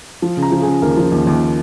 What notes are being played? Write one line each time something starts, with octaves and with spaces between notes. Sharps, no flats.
F3
C#3
A#5
F3
C#3 G#4
D#2 A#4
F3
D#2
D#2